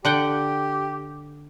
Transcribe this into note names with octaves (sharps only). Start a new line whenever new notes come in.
D3 G4 F#5 G5